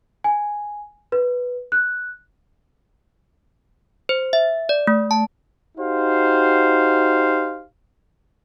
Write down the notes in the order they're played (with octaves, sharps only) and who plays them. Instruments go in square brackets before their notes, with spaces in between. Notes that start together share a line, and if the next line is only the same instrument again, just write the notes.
[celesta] G#5
B4
F#6
[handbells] C5
E5
D5
A3
A5
[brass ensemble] D#4 F#4 G4 C5 F5